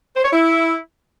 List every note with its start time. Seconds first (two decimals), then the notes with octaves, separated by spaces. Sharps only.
0.17 C5
0.25 C#5
0.33 E4